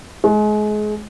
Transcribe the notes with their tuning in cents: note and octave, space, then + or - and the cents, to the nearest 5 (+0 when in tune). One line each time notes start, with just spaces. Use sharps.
G#3 +30